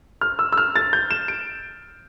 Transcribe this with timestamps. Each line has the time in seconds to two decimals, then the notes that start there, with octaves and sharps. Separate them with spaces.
0.21 F6
0.39 E6
0.52 E6
0.58 F6
0.76 A6
0.93 G6
1.11 E7
1.28 D7